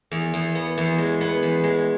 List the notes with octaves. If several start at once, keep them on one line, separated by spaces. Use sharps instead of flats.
E2
E2
B3
E2
G#3
B3
E2
G#3